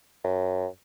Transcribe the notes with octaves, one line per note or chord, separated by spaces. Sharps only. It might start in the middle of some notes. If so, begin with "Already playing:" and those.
F#2